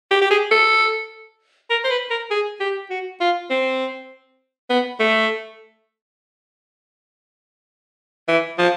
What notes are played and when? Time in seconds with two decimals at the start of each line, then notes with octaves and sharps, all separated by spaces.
0.11 G4
0.22 G4
0.31 G#4
0.51 A4
1.70 A#4
1.84 C5
1.91 B4
2.10 A#4
2.31 G#4
2.60 G4
2.90 F#4
3.20 F4
3.50 C4
4.70 B3
5.00 A3
8.28 E3
8.59 F3